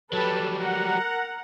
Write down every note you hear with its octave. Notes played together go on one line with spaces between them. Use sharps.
F#3 G3 A4 B4 A5
A#4 F#5 A#5